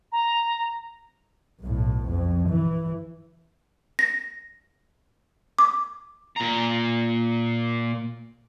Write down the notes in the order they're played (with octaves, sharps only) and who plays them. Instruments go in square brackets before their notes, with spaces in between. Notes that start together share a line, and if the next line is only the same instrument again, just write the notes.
[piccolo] A#5
[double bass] B1 A2
F2
E3
[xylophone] A#6
D6
[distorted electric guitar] A#2 A#5